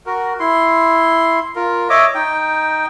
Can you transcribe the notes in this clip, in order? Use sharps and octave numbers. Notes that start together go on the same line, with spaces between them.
F#4 A#4
E4 C6
F4 A#4
C#5 D#5 E5 D6
D#4 G5